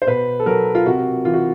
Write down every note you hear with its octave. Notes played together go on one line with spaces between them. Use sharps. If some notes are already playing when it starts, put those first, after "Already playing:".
C5
B2 B4
A4
F#3 A#4
F4
C3 F#4
E3 F4
F#4